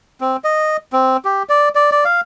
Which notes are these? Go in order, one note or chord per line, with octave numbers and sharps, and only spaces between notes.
C4
D#5
C4
G4
D5
D5
D5
F5